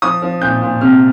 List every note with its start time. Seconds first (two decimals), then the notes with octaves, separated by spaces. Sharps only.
0.02 F3 D#6
0.22 F3
0.41 A#2 G6
0.62 A#2
0.81 C3 F6